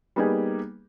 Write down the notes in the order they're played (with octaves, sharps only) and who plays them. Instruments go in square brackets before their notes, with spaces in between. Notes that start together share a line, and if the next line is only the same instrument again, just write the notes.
[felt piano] G3 A#3 B3 D#4 G4 G#4